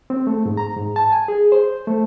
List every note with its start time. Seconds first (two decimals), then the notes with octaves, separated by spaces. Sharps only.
0.10 C4
0.27 A3
0.46 G#2
0.57 A#5
0.76 G#2
0.96 A5
1.12 G#5
1.28 G#4
1.52 C5
1.87 A3